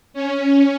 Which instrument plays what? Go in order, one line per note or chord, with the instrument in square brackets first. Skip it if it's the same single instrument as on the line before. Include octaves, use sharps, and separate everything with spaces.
[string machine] C#4